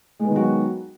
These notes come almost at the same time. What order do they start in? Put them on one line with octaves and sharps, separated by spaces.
G#3 B3 D#3 F#3 F#4